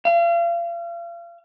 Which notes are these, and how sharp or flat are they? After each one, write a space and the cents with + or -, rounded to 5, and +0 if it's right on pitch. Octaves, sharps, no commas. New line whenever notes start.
F5 -40